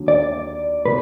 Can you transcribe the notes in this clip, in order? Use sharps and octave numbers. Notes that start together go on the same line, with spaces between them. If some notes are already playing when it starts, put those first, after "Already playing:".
Already playing: D#2 D3 F#3
D5
B2 B4